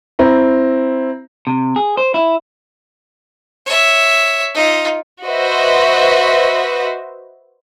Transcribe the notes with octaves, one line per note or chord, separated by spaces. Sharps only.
C4 E4 A#5
C3
G#4
C5
E4
C#5 E5
D#4 F4
F#4 B4 C5 D#5 E5